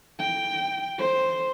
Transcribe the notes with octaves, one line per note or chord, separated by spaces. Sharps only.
G5
C5